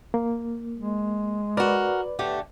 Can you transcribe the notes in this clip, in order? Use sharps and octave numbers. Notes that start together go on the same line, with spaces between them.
A#3
G#3
F#4 A#4 B4 D5
D3 A3 G4